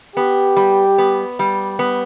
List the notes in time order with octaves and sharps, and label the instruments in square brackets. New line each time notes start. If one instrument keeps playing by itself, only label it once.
[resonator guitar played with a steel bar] B3 [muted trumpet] G4
[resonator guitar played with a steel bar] G3
B3
G3
B3